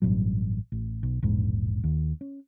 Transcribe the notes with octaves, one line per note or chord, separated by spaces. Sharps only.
A1 G2 B2 F#3
A1
B1
E1 A#1 G#2
D#2
C#4